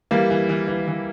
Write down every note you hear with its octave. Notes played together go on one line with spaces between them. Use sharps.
E3 G3 A#3
E3
E3
E3
E3